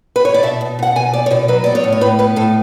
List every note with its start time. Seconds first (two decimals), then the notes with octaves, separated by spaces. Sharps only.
0.16 B4
0.25 C#5
0.34 D5
0.43 B2 E5
0.61 B2
0.79 B2 F#5
0.96 B2 G#5
1.13 B3 D5
1.26 C#5
1.31 B2 D5
1.48 F#3 B4
1.64 B3 D5
1.75 C#5
1.84 A2
1.92 C#5
2.01 A2 B4
2.19 B3 B4
2.36 A2 A4